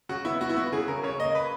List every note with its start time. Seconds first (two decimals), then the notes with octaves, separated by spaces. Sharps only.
0.09 C#3 F#4
0.25 B3 E4
0.41 B3 F#4
0.49 E4
0.56 B3 F#4
0.72 C#3 G#4
0.88 C#3 A#4
1.03 C#3 C#5
1.19 A#3 D#5
1.35 B4